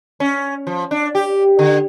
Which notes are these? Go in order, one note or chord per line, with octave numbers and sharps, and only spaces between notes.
C#4
F3
D4
G4
D3